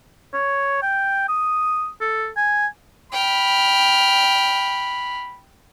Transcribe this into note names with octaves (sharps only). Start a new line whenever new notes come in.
C#5
G5
D#6
A4
G#5
G5 B5 F6